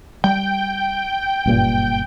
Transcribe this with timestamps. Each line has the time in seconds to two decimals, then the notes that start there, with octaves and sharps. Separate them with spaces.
0.24 G3 G5
1.46 F#1 G2 A#2